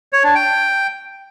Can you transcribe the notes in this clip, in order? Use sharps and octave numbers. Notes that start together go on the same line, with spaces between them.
C#5
D4
G5